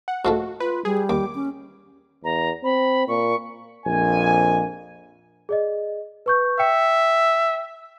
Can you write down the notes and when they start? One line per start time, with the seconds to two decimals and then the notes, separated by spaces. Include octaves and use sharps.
0.08 F#5
0.25 G#2 F3 A3 F#4
0.60 F4 B4
0.85 G3 G#4
1.09 D#2 D6
1.35 C#4
2.24 E2 A#5
2.64 C4 B5
3.08 A#2 C#6
3.86 A#1 F2 G#5
5.49 G#4 D5 D#5
6.26 B4 C#6 G6
6.59 E5 G5 C#7